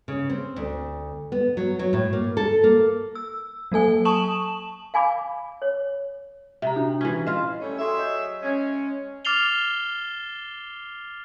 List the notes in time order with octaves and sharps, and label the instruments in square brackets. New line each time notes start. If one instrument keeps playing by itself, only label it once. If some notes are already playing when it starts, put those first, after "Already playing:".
[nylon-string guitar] C#3
C4
D2
B3
F#3
F#3
A2
A#3
A4
A#3
[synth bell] E6
F#3 A#3 A4 G#5
A5 C#6 D#6 E7 F#7
[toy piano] F5 G#5 B5 D6
C#5
[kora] C3 [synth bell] E5 A#5
[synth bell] D4 F#4
[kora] E3 C#4 [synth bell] B6
[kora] F4 F5 [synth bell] D#5
[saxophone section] G3 A3 C#4
[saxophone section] F#3 G#4 E5 [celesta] A4 C6
[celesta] D#5 G6
[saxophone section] G#3 C#4
[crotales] D6 F6 A6 C7 F7 G7